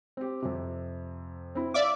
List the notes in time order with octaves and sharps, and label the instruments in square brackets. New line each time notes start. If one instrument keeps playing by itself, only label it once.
[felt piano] C4 G4
F2 C3
C4 E4
[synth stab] D5 E5 D6 [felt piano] F5